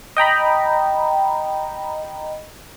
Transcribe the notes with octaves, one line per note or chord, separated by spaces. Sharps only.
D#5 G5 A#5 B5